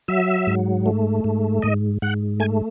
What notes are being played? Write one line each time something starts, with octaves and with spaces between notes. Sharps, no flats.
F#3 E5
G#2
A3
G#2
G#2 D#5
G#2 F#5
A3 G#5